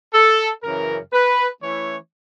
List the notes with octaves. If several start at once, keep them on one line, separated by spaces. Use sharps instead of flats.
A4
F#2 C#3 E3 A#4
B4
E3 A3 C#4 E4 C#5